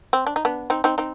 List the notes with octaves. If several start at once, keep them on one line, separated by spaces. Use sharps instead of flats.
C4
D4
D#4
B3 D4
C4 D#4
C4 D#4
C4 D#4